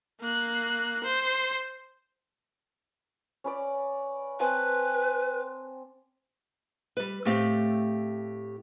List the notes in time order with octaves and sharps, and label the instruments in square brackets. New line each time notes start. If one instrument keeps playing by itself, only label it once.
[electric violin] A#3 F#6
C5
[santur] C#4 B4 D5
[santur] C4 G#5 A5 [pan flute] B4
[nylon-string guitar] G3 B4
A2 A3 C4 G4 F5